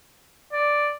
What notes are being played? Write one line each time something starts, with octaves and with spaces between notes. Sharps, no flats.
D5